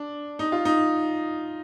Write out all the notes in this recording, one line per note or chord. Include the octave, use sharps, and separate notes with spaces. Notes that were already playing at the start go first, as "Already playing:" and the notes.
Already playing: D4
D#4
F4
D#4